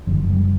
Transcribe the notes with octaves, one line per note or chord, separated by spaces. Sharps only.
F#1 F#2 D3 F3
G3